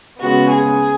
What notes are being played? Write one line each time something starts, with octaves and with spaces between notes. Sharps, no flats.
C#3 G#3 B3 F#4
G#4